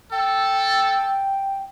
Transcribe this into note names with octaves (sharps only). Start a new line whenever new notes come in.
A4 G5